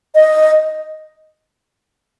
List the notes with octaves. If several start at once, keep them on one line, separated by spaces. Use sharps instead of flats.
D#5